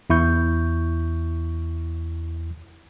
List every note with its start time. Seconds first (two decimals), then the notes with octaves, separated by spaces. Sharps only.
0.10 E2 E4 C#6 G6